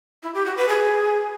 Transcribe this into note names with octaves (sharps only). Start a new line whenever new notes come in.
E4
G4
F#4
B4
G#4